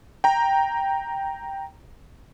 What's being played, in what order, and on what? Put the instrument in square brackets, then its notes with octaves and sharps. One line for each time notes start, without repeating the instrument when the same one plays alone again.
[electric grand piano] G5 A#5